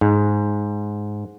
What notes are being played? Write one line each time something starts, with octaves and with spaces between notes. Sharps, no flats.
G#2